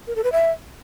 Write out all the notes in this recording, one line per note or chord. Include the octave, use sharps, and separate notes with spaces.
A#4
A4
B4
E5